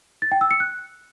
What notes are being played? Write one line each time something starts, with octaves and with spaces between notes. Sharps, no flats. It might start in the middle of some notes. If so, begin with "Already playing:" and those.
A6
G5
E6
C#7
F#6